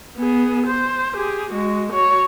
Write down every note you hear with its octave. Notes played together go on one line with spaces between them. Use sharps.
B3 G#4
C5
G4 G#4
G#3 F#4
F#4 C#5